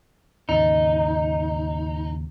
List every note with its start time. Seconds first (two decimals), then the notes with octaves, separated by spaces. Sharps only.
0.49 D#2 G#2 C#3 D#4